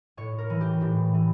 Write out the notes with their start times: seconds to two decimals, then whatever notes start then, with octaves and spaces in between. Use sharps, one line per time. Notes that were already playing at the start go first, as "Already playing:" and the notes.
0.17 A2 C#5
0.38 A#4
0.50 E3
0.61 G4
0.81 A2 G4
1.14 E3